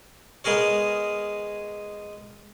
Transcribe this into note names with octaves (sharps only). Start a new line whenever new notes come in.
G#3 B3 G#4 A#4 C#5